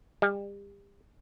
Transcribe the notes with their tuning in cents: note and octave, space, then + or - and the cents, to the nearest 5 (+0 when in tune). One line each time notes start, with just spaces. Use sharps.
G3 +35